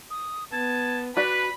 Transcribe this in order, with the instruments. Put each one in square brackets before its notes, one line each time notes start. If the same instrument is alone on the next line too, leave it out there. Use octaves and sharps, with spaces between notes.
[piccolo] D#6
[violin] B3 [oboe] A5 [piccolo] G#6
[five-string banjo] F#4 D5 [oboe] B4 [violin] B5 [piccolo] B6